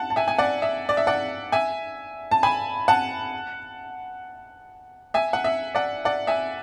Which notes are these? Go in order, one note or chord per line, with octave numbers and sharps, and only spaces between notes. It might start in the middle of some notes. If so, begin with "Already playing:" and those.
Already playing: F#5 A5
A5
E5 G#5
G#5
D5 F#5
E5
D5
E5
D5 F#5
E5 G#5
A5
G#5 B5
F#5 A5
E5 G#5
F#5
E5
D5 F#5
D5 F#5
E5 G#5